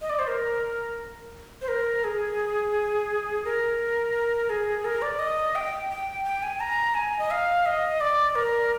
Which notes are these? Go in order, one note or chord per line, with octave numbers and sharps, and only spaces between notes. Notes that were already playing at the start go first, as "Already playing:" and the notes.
D#5
D5
C5
A#4
C5
A#4
G#4
A#4
G#4
A#4
D5
D#5
G5
G5
G5
G#5
A#5
G#5
D#5
F5
D#5
D5
A#4